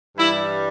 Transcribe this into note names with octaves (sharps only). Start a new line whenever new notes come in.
G2 E3 G3 E4